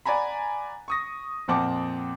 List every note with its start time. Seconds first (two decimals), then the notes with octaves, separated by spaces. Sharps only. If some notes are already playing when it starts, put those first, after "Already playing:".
0.06 D5 F#5 G#5 A#5 B5
0.88 C#6 D#6 A#6
1.48 F2 A#2 C4 F#5 A5 D6